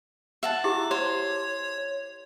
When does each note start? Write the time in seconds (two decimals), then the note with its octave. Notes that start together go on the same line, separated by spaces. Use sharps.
0.43 E5 F#5 A5
0.64 E4 G4 G#4 D6
0.91 C5 C#5